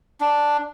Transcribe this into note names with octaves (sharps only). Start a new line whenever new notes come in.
D4